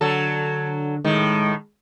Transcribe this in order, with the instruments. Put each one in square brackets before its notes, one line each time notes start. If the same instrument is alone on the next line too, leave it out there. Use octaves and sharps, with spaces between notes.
[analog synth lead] D3 [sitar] F#3 A4
[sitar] A2 D#3 [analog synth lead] G#3